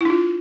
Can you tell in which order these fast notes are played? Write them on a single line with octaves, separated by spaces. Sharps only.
E4 D4 F4